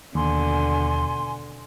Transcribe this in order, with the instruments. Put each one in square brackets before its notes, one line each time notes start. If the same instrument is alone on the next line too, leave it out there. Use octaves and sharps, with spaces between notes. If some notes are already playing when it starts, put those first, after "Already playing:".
[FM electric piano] D#2 [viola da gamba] B2 D3 [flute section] G#5 C6